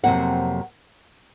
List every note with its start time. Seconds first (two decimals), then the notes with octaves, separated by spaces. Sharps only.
0.03 F2 C3 F#3 A#3 F#5